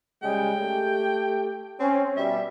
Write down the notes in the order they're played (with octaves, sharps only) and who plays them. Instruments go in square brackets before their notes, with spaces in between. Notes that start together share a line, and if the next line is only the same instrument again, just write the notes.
[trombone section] C#3 G3 G#3 [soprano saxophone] G5
[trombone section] A3 G4
[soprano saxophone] C4 [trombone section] C#4
[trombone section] B2 G3 [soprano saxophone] E5